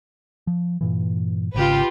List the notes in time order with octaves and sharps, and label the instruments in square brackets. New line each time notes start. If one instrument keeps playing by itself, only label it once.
[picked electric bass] F3
G2 A#2 E3
[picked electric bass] G#1 C#3 [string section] F4 G4 B4